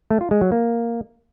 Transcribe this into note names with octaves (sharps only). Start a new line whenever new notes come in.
A3
F4
G#3
F#3
A#3